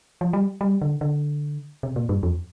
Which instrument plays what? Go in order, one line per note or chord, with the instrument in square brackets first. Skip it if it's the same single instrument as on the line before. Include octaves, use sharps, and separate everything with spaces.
[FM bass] F3
G3
G3
D3
D3
C3
A#2
G2
F2